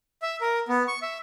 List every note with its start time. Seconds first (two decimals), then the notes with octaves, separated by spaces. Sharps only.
0.22 E5
0.41 A#4
0.69 B3
0.88 C#6
1.02 E5